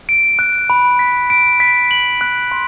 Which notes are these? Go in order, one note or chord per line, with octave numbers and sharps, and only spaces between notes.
D7
F#6
B5
B6
D7
B6
F#7
F#6
C6